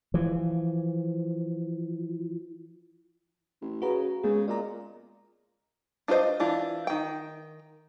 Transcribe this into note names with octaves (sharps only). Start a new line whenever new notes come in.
E3 F3
A1
C#3 F#4 B4 A#5
C#3 G#3 B3 G#4
A#2 D5 D#5 A#5
D4 F4 A#4 C5 D#5
E3 D4 F4
D#3 G5